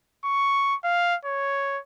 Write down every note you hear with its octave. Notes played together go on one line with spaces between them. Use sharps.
C#6
F5
C#5